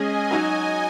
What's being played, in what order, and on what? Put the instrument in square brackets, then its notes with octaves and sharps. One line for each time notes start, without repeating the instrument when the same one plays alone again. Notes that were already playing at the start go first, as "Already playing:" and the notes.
Already playing: [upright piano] G#3 C#4 G#4 [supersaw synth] D#5 G#5
[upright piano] F#3 D#4 F#4 [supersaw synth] D#5 G#5